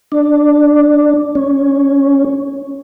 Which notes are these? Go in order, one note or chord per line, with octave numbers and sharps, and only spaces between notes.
D4
C#4